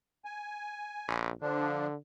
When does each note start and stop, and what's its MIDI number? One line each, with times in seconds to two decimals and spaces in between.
0.25 1.16 80
1.08 1.30 34
1.42 1.95 50
1.42 1.87 53
1.42 1.87 62